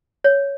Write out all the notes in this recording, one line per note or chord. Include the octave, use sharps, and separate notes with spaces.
C#5